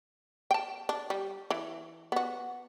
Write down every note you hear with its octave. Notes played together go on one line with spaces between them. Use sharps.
G5 A5
D4
G3
E3
B3 F#4